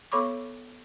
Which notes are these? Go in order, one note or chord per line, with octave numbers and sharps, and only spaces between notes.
B3 A4 C#5 B5 C#6 D6